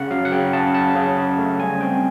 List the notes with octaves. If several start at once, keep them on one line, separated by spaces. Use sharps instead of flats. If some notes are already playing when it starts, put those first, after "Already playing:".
Already playing: C#3 F#5
F#3 F5
F#5
C#3 G5
C#3 A5
C#3 A5
C#3
C#3
A3
G3 G#5
C4 G5